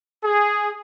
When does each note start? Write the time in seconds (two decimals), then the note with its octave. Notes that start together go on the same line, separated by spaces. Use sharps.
0.22 G#4